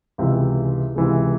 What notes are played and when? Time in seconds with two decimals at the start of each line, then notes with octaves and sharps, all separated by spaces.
0.18 C#2 C3 E3 G#3
0.96 C#2 C3 E3 G#3